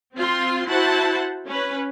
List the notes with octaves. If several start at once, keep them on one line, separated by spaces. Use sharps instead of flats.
C4 F4 C6
E4 F#4 C5 F#5 A5
C#4 B4